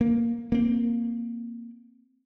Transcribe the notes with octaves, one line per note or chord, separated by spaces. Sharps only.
A#3
A#3 C4